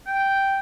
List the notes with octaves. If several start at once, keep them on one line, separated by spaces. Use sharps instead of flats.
G5